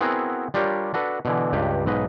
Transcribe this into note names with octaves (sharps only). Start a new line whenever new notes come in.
B3 C4 E4 F#4 G#4 A#4
G3 D4 F4 G4 A#4 C#5
D4 F#4 A4 B4
B2 D3 E3
C#2 G2 G4 B4
B1 G#2 B4 D#5